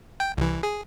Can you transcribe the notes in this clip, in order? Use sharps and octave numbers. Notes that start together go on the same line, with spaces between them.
G5
C2 E3
G#4